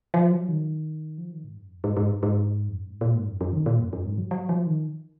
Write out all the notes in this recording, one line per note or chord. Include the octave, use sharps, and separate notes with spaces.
F3
F#3
D#3
F3
D#3
G#2
F#2
F2
G#2
G#2
G#2
F2
F#2
G#2
A#2
G#2
F#2
F#2
D#3
A#2
F#2
F#2
G#2
F#3
F#3
F3
D#3